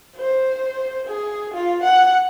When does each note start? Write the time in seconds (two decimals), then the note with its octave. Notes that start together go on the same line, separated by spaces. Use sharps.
0.16 C5
1.07 G#4
1.54 F4
1.83 F#5